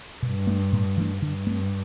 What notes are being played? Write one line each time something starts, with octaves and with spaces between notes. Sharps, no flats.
G2 B2
A3 D4
A2
E3 A3 D4
G2 D3
A3 C4